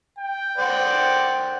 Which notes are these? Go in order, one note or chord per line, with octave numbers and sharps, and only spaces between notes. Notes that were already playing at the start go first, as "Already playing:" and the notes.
G5
C5 D5 F#5